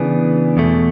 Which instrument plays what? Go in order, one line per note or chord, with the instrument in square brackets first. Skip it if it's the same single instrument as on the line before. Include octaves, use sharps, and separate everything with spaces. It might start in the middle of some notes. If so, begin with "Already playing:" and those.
Already playing: [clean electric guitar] C#3 E3 B3 D4 G#4
E2 B2 A3